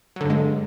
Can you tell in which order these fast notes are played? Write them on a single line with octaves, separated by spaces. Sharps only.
F#3 D3 G2 G#3